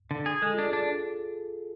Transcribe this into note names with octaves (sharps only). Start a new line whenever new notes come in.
D3
G#4
G#3 A4
D4 F4
G#4
D4